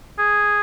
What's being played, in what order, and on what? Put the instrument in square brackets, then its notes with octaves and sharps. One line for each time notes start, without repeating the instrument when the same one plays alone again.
[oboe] G#4